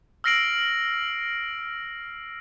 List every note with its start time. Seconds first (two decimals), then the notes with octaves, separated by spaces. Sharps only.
0.24 E6 F6 A#6 C7 D7 F#7